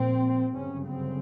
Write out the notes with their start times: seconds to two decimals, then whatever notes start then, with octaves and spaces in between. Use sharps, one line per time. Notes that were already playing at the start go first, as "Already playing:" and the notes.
Already playing: A#1 A#2 C4
0.54 G1 F#2 C#3 C#4
0.86 C4